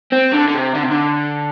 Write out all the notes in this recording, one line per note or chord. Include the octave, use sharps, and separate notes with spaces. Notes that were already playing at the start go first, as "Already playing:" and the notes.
C4
D3
D3
C3
D3
C3
D3